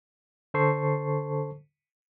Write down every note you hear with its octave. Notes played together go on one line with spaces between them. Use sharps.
D3 A4 C5 A5 C#6 C7